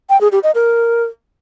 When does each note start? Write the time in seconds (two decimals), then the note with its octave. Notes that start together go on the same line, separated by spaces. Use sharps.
0.09 G5
0.21 G#4
0.32 G4
0.43 D#5
0.55 A#4